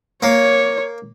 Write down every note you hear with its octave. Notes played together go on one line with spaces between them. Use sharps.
A#3 C#5